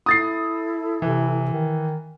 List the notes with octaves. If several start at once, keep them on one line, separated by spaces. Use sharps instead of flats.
E4 A4 D#6 A6 C7
C3 E3
D#3